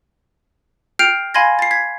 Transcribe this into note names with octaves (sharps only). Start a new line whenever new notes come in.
G5 F6 G6 C7 D7 F7
F5 G#5 B5 C6 G#6 A#6
A6 C7
G#6 B6